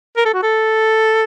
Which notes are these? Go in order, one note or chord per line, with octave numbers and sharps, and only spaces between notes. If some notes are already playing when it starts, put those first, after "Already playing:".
A#4
A4
F#4
A4